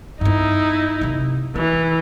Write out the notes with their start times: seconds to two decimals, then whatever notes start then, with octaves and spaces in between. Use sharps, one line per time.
0.21 G2 B3 D#4 E4
1.01 C3 A#3
1.56 E3 B3